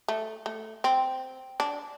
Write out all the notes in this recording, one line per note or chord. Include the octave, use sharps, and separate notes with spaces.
A3
A3
C4
D4